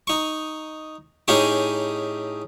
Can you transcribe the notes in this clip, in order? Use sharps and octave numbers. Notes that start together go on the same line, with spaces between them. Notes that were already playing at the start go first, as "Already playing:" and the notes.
D#4 C#6
A2 C#4 D#4 G4 G#4 C#6